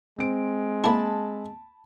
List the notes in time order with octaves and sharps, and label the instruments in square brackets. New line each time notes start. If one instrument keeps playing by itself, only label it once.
[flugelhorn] G#3 [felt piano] C4 D7
[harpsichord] A#3 E4 [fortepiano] A5 B5